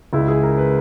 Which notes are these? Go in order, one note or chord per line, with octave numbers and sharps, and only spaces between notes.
C#2 C#3 G#3 E4
G#4
A#4
B4